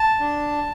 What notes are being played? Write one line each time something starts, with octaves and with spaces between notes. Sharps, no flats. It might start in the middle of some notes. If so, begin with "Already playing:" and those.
Already playing: A5
D4